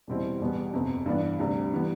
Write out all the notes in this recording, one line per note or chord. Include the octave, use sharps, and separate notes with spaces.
E2 B2 G3 C4 E4
E1 E2 B2 G3 B3
G1 F2 C3
G2 E3 B3 D4
D2 C3 G3 D4
E3 G3 B3